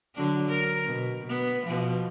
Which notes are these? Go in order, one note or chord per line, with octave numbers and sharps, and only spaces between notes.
D3 F#3 D4
A#4
B2
B3
B2 F3